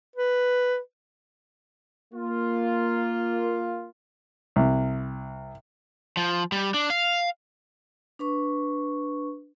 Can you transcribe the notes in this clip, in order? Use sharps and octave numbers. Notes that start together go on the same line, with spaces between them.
B4
A#3 F4
C2
F3
G3
D4
F5
D4 B4 C#6